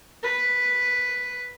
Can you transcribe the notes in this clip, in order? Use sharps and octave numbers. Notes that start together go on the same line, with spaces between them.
B4